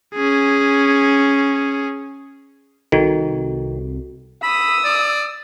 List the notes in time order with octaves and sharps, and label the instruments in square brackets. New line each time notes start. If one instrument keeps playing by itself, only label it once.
[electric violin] C#4 G#4
[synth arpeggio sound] C2 [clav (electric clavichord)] D#3 [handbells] F#4 A4
[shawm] B5 [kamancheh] D#6 E6
[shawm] D5